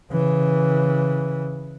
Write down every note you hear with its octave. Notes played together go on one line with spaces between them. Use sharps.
C#3 E3